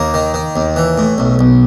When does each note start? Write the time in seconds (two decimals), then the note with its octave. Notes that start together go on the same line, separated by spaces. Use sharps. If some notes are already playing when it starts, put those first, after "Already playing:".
Already playing: D#2 A#3
0.14 D#3
0.34 D#3
0.56 D#2
0.76 E3
0.98 A2
1.18 B1
1.39 B1